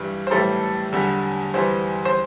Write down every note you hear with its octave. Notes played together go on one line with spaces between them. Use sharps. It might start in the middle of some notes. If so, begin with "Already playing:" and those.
Already playing: G2 E3 G3
C5
A2 E3 G3 A4
E2 D3 G3
E2 E3 G3 C5
C5